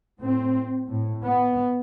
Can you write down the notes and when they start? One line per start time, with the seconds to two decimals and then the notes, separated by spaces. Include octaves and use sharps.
0.20 A2 C4
0.89 A2
1.24 B3